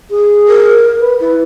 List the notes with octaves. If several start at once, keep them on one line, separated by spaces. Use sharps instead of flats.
G#4
A#4
B4
E4 B4